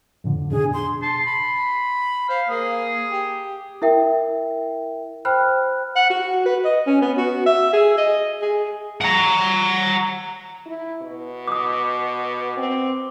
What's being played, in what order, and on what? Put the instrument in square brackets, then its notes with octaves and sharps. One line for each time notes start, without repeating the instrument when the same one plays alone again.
[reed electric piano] F2 A2 D3
[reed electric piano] B2 D4 [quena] G#4
[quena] C6
[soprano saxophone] A5 [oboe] C6
[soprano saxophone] B5
[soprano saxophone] C5 [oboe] F5
[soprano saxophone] A#3 [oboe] G#4
[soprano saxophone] G4
[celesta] E4 A#4 E5 G5
C5 G5 B5 F6 F#6
[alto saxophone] F#5
F#4
B4
D#5
C#4
B3
F#4
E5
G#4
D#5
G#4
[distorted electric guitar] F#5 A#5
[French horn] E4
B2
[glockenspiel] D6 D#6
[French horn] C4